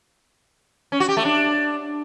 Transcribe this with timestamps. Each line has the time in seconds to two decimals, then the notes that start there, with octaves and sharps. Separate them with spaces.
0.92 C#4
1.00 F#4
1.09 G4
1.17 A3
1.25 D4